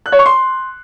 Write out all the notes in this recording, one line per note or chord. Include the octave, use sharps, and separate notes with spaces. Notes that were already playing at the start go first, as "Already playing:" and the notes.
F#6
C#5
C#6
C6